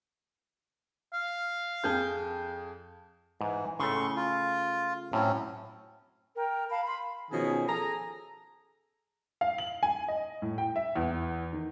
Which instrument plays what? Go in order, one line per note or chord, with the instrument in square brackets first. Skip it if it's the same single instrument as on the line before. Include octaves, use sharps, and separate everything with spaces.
[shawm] F5
[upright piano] F2 G#4 G6
[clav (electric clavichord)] G#2 [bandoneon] E3
[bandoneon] A2 C6 C#6 [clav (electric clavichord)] C#3 A3
[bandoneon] F4
[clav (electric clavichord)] A2 [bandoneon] F#3 C4 C#4
[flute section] A#4 G5
F5 A5 B5
B5 C6
[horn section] B2 D#3 F3 C#4 G#4
G#4 A4 A#5
[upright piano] F5
F#7
G#5
D#5
A2
G5
E5
E2
D#3